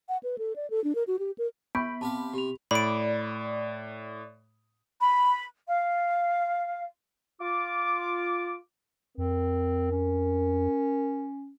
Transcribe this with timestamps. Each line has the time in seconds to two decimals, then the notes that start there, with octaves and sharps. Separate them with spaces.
0.09 F#5
0.23 B4
0.38 A4
0.56 D5
0.70 A4
0.84 D4
0.95 A#4
1.07 F#4
1.19 G4
1.38 A#4
1.75 B3 B5 G6 B6 D7
2.01 C3 G4 F5 A5
2.34 C3 G4 F7
2.71 A2 D5 B5 D7
5.01 B5
5.67 F5
7.41 F4 D6
9.18 F2 C4 A#4
9.92 C#4